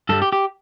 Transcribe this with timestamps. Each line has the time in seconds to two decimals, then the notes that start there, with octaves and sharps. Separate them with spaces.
0.09 G2 G3 A4
0.22 G4
0.32 G4